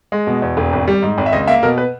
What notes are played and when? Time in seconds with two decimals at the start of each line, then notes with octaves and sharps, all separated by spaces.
0.12 G#3
0.27 B2
0.42 E2
0.57 E1
0.73 G#1
0.88 G3
1.02 G#2
1.18 G#1
1.26 E5
1.33 C#2 D#5
1.47 A#3 E5
1.62 B2 A#4
1.78 B4